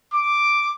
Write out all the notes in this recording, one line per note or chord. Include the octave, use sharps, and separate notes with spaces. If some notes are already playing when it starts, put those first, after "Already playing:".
D6